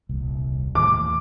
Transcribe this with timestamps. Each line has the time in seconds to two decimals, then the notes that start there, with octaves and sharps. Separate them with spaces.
0.09 D#1 C2
0.75 D#2 A2 E3 D6